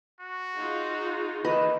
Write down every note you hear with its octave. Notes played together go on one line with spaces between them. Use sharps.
F#4
D#4 F4 G#4
D#3 E3 A#3 B4 D#5